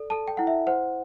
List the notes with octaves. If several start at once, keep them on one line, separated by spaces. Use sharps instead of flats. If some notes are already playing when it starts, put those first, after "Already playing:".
Already playing: A4 D5
A4 A5
G5
E4 F#5
E5
C5 F#5